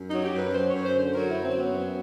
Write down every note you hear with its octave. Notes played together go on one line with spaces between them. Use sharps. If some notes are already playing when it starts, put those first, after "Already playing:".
Already playing: F#2
F#3 D#4
G4
F#2 B4
F#3 C5
F#2 C#5
C5
D3
C5
F#3 A#4
E4
F#2
C4
F#3 B3
F#2